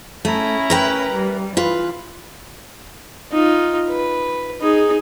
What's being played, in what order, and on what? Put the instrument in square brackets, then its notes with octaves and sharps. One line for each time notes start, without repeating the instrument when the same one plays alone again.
[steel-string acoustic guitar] A3 [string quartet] C#4 E4 A#5
[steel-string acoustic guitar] A#4 B4 G5
[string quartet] G3
[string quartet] E3 [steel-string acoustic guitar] F4 B4
[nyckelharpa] D#4 F4
B4
D#4 G#4